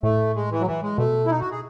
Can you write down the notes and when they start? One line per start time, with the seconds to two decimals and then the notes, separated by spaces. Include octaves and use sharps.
0.03 A2 A3
0.35 G#3
0.51 E3
0.61 F#3
0.66 E3
0.83 G#3
0.98 B2 A3
1.26 E4
1.31 D#4
1.40 F#4
1.51 G#4